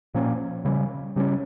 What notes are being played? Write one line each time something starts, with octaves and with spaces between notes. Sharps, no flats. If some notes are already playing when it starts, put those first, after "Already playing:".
A#2 F3 A#3 C#4
C#3 G3 C#4
C#3 G3 C#4